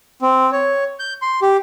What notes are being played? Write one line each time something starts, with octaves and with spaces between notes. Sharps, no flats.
C4
C#5
G6
C6
G4